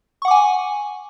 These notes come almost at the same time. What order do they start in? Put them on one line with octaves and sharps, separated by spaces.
C#6 F#5 D6 G#5